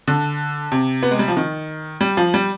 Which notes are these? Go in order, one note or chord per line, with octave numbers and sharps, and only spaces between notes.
D3
C3
B3
G#3
G3
F3
D#3
G3
F3
G3